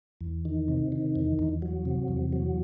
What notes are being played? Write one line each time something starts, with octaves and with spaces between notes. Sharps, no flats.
E2
D#3
C3
D#3
E2
E2
F#3
C3
E2
F#3